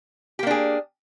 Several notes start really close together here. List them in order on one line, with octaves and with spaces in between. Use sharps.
G4 A#3 D4 G#4